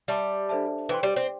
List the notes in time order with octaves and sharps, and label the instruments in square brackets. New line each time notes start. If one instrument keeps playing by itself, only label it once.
[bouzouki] G3 [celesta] G4 E5 A5 D6
[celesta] D4 A4 C5 E5 A5
[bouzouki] E3 [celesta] C5 G5 C6
[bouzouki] G3
C4